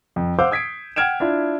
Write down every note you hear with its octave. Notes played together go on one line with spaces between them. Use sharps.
F2
C5 F5 F#5 D6 E6 G6
D#6 G#6 B6 C7 D7
F#5 G5 F6 G#6 D7 E7
D4 E4 F4